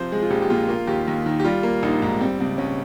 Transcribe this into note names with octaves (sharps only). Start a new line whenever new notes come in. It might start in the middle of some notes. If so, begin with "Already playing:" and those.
Already playing: C3 F3 C5
G#3 G#4
F4
A#1 G4
G4
A#2 F4
A#3 F4
D#2 G4
D#2
D#3
G4
G3 F4
A#3
A#1 D#4
G#2
G3 C4
C#2 C4
C#2 C#4